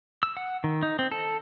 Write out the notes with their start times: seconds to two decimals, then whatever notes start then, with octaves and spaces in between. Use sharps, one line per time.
0.23 E6
0.37 F#5
0.64 D#3
0.83 D#4
0.99 C4
1.12 A4